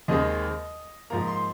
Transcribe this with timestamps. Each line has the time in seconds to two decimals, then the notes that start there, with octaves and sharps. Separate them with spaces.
0.08 D#2 D#3 G#3 C4 D#5
1.10 G#2 F3 A#3 A#5
1.27 C6